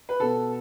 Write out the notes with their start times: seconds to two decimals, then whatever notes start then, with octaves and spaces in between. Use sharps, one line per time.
0.09 B4
0.20 B2 B3 A4